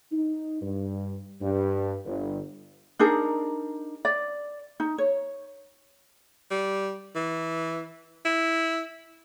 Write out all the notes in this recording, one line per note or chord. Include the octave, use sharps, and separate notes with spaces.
D#4
G2
G2
G1
D4 D#4 G#4 A#4
D5
D#4
C#5
G3
E3
E4